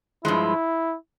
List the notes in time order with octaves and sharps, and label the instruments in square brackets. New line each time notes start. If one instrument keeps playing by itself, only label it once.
[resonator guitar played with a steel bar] G2 F3 G#3 [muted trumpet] E4